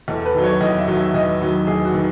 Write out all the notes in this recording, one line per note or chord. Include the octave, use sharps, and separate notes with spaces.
E2 A4
A4
B4
D#3 F#3
C#5
E2 D#5
E5
D#3 F#3
E5
E2 D#5
D#3 F#3
E2 G#4
F#4
D#3